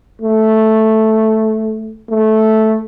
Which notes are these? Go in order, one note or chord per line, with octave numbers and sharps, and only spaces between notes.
A3
A3